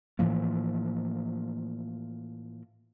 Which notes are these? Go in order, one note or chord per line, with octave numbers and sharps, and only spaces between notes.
A2 E3 F3 A#3